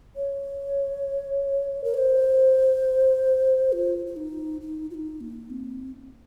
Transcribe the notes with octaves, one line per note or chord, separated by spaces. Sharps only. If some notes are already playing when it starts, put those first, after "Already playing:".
C#5
A#4
C#5
C5
F4
F4
D#4
D#4
F4
D#4
A#3
C4